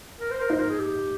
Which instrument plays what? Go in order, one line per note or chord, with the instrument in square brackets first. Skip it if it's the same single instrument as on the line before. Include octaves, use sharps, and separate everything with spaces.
[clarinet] A#4
C5
A#4
[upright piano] D#4 [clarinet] C5
[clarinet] A#4
G#4
G4